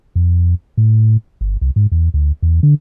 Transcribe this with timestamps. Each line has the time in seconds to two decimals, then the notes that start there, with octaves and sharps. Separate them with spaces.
0.16 F2
0.77 A2
1.41 G1
1.61 C2
1.76 G#2
1.92 E2
2.14 D2
2.43 E2
2.63 D3